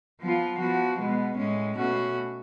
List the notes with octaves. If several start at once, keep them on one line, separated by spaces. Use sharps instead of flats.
F3 B3 F4
F3 B3 F#4
B2 G#3 B3
A2 G#3 C#4
B2 A3 C#4 F#4